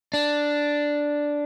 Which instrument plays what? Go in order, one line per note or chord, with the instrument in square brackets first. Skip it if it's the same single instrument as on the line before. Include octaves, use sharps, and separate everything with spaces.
[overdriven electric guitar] D4